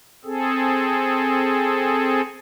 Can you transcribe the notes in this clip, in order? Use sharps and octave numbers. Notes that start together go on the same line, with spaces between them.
C4 G#4 A4